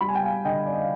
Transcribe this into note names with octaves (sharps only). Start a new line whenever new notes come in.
G3 B5
G#5
G5
F5 G#5
D3 D#5 G5
D5
D#5
F5